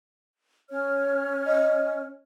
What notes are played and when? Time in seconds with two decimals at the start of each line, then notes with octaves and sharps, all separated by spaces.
0.70 C#4 C#5 F6
1.46 D#5